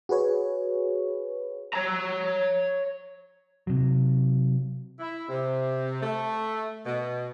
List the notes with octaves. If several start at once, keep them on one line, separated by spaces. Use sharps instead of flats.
F#4 G#4 B4 C#5
C#5 A#5
C3 F#3
E4
C3
A3
B2